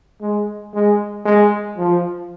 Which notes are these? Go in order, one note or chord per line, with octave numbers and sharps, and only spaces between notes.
G#3
G#3
G#3
F3